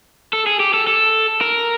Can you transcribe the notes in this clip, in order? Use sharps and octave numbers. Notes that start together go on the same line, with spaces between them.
A4
G#4
G4
A4
A4
A#4